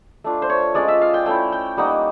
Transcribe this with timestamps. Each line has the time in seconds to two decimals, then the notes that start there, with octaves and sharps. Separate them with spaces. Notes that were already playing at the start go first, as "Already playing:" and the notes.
0.24 A3 D4 F4
0.42 C5
0.49 C#5
0.75 G#3 C#4 F4 D5
0.88 E5
1.01 F5
1.14 G5
1.26 A3 C#4 E4 G5
1.52 G5
1.77 G3 A#3 D#4 F#5